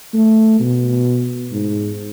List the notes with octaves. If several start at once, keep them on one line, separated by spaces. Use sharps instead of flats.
A3
B2
G#2